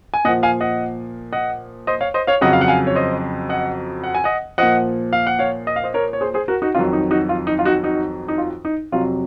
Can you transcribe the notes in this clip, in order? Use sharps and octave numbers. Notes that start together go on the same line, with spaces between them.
G#5
A#2 F3 D#5 F#5
F5 G#5
D#5 F#5
D#5 F#5
C5 D#5
C#5 F5
C5 D#5
C#5 F5
F2 C#3 F#3 D#5 F#5
F5
F#5
F5 G#5
C#5
C5 D#5
D#5 F#5
F#5
G#5
D#5 F#5
A#2 F3 D#5 F#5
F5
F#5
C#5 F5
D#5
F5
C5 D#5
A#4 C#5
C#5
G#4 C5
G#4 C5
F#4 A#4
D#4 F#4
F2 D#3 F#3 F4
D#4
D#4 F#4
F4
D#4
F4
D#4 F#4
D#4 F#4
D#4
F4
D#4
F2 C3 F#3 F4